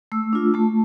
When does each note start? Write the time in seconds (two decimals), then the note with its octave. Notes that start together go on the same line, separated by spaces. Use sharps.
0.12 A3 E6
0.33 D4 F4
0.54 A3 A5